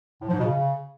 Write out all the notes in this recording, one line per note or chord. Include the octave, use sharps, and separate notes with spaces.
A2
F3
G#2
B2
C#3